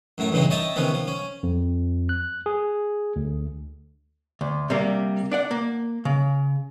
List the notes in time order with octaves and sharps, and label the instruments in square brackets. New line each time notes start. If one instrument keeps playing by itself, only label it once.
[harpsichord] F#2 A2 A3 A#4
E2 G2 A#2 C#3 C4 D#4
C#5 D#5 E5 G5 A5 A#5
C3 D#3 F3 B3 C#4
F3
C#4
[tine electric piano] F2
F#6
G#4
D2
[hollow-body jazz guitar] D2
C3 G3 A#3
D4 D5 F#5
A#3
C#3